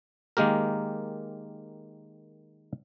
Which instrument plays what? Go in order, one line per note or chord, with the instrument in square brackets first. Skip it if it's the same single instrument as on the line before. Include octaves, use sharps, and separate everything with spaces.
[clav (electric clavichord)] D#3 G#3 A#3 G4 A#4